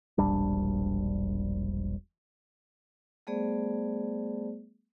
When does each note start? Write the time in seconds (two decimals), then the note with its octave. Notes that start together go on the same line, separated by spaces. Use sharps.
0.18 E1 A#1 G3 D4
3.27 G3 A3 B3 G#4 C5 D5